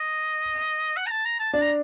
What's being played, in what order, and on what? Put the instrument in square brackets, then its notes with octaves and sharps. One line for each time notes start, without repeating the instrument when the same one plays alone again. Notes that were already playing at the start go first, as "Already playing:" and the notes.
Already playing: [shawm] D#5
F#5
A#5
A5
A#5
A5
[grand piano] D4 [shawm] A5
[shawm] A#5